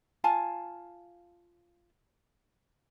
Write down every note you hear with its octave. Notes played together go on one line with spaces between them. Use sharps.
F4 F5 G#5 A5